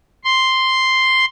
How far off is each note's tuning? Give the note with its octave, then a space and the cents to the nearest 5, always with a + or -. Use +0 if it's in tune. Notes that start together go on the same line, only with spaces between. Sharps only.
C6 +0